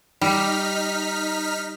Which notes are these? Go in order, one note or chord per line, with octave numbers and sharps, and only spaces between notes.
G3 D#4 F6 B6